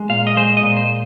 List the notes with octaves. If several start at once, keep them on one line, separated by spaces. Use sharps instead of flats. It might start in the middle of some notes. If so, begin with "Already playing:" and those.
Already playing: G#3
A#2 F5
D#5
G#3 C5
D#5
A#2
C5